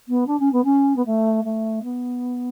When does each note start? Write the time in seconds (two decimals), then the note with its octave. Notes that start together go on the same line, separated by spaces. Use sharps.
0.08 B3
0.26 D4
0.39 C#4
0.52 B3
0.64 C#4
0.96 B3
1.05 A3
1.44 A3
1.83 B3